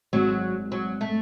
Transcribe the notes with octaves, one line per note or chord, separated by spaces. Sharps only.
G#1 G#2 F#3 G#3
F#3
A3